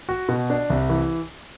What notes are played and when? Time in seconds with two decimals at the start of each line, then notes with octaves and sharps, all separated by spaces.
0.09 F#4
0.29 B2
0.50 D4
0.70 C2
0.90 E3